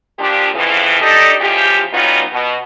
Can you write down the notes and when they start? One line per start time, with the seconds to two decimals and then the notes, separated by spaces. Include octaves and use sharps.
0.19 A#2 F3 D4 G4
0.54 F2 C#3 E3
1.01 D4 D#4 G4 A4 D5 D#5
1.40 E2 C#3 F3 F4 G4
1.94 F#3 G3 B3 C#4 D#4 F4
2.33 B2